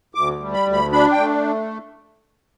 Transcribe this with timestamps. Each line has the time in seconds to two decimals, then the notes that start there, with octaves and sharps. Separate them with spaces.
0.15 D2 D6
0.40 G3
0.53 B5
0.67 D2
0.73 B5
0.92 D4 B5
1.12 G5
1.18 A3